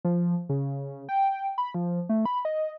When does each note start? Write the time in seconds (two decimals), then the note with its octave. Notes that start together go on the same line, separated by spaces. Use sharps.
0.05 F3
0.49 C#3
1.09 G5
1.58 B5
1.74 F3
2.09 A3
2.25 B5
2.45 D#5